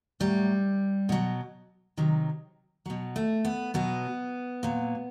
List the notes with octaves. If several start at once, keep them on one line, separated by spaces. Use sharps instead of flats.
A2 F#3 G3
B2 F#3
C3 D#3 F#3
B2 F#3
A3
B3
B2 F#3 B3
A#2 F#3